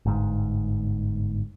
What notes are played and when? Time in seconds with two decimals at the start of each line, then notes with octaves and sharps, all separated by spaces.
0.06 G1 G#2